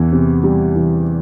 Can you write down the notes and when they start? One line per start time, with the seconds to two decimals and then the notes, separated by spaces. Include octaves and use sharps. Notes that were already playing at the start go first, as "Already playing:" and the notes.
Already playing: E2 E3
0.12 C3
0.44 G3
0.76 E3